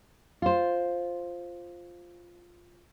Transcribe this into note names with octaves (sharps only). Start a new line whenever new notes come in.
F4 C5